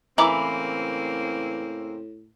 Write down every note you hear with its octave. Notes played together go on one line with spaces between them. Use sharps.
A2 C#3 E3 A#3 C4 A#5 B5 D6